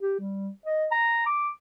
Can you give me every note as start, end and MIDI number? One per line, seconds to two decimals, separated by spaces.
0.01 0.14 67
0.20 0.49 55
0.66 0.86 75
0.92 1.22 82
1.26 1.49 86